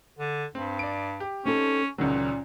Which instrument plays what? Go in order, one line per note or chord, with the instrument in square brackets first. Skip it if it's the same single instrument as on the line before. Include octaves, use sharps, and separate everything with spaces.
[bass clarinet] D3
[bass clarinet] G2 [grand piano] C4
[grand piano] D5 D7
G4
[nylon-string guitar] C4 D#4 A4 [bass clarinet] C#4
[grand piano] C#2 D#3 F#3 [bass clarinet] A#2 [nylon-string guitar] C#4